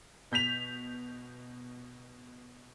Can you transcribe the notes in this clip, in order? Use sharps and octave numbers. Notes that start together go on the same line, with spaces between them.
B2 G6 B6 F7